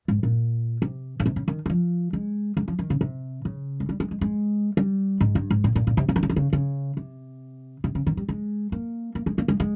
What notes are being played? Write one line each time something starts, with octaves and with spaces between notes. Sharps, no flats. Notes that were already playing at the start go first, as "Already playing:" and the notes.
G#2
A#2
C3
C#3
C3
C#3
D#3
G3
F3
G#3
G#3
F3
D#3
C#3
C3
C#3
G#3
G3
G#3
G#3
G#3
G3
G#2
G2
G#2
A#2
A#2
A#2
C3
C#3
D#3
C#3
D#3
C#3
C#3
C3
C3
C#3
D#3
G3
G#3
A#3
A#3
G#3
A#3
G#3
G#3